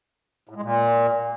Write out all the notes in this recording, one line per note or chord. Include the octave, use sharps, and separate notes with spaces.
A2
G#3
A#2